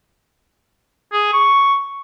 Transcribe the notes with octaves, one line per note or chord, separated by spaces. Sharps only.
G#4
C#6